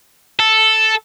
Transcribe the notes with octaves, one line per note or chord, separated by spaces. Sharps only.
A4